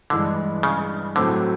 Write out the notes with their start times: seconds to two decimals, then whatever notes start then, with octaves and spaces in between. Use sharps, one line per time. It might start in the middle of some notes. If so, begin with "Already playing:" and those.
0.10 G2 D3 E3 G#3
0.63 C#3
1.16 A2 D3 F#3 A3 C4